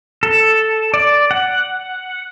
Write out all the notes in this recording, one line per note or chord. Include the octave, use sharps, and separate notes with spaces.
A4
D5
F#5